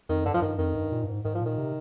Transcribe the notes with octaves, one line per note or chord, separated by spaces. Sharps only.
F2 D#3
G2 D3
F3
G2 D#3
F2 D#3
G2
A#2
G2
G#2
G#2 D#3
F3
A#2 D#3
C3